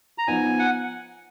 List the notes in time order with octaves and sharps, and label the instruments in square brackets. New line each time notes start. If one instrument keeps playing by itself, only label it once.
[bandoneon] A#5
[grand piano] F3 B3 D#4 [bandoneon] G#5
[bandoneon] F#5